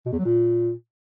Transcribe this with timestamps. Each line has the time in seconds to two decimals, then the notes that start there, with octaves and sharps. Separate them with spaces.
0.06 B2
0.12 E2
0.19 F#3
0.25 A#2